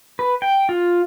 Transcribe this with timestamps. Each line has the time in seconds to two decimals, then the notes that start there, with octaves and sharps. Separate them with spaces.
0.19 B4
0.42 G5
0.69 F4